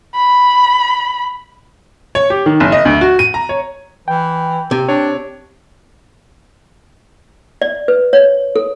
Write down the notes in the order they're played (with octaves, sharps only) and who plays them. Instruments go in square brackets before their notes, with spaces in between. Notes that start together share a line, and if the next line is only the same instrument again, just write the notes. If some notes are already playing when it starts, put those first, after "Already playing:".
[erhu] B5
[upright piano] C#5
G4
D#3
F#1
D#5
D2
F#4
D#7
A#5
C#5
[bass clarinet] E3 [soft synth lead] G5
[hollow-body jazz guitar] C3
[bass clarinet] D4 [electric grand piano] C#5
[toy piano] D5
B4
C#5
A4